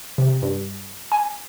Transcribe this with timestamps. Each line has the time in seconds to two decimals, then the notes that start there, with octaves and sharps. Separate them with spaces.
0.18 C3
0.42 G2
1.12 G#5